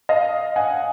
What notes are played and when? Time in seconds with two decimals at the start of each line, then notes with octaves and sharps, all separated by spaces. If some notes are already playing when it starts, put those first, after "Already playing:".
0.09 D#5 F5
0.56 F#5 G#5